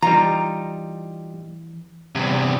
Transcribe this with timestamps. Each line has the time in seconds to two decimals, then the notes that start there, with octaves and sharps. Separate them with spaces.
0.02 E3 G3 D#4 F4 A#5
2.15 E2 G2 C3